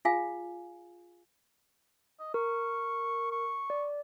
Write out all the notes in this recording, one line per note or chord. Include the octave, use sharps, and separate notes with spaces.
F4 G#4 F5 G#5
D#5
A#4 C#6
C#6
D5